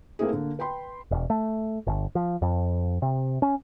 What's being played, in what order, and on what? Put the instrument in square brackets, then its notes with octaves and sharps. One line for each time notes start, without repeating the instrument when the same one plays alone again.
[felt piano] A3 A#3 C4 E4 G#4
D3 A#3
B4 G5 B5 C6
[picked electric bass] E1
A3
G1
F3
F2
C3
C#4